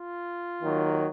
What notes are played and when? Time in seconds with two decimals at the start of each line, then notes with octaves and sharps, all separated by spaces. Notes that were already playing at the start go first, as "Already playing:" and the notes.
Already playing: F4
0.62 D#2 D#3 F#3